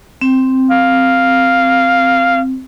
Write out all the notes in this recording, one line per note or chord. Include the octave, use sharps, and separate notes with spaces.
C4
F5